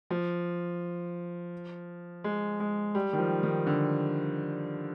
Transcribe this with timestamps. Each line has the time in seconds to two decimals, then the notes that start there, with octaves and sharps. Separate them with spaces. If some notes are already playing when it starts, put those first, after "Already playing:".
0.10 F3
2.24 G#3
2.60 G#3
2.95 G3
3.13 D#3
3.18 F3
3.43 D#3
3.67 D3